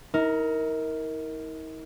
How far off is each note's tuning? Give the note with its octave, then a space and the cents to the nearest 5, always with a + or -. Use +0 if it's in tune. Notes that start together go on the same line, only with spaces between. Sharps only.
D#4 +45 A#4 +0